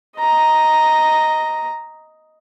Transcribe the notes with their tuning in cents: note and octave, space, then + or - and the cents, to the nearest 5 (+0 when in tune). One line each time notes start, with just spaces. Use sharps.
D#5 +5 A#5 +0